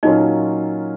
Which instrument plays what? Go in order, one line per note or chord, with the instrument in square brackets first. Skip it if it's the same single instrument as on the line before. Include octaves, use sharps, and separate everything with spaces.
[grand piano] A#2 F#3 A#3 C#4 F4 [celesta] D#4 D#5